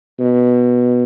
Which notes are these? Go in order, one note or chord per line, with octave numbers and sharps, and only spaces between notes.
B2